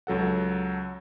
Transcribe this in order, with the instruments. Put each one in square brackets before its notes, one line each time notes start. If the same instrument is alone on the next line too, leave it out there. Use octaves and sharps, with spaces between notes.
[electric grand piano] C#2 F#3 A4 F#5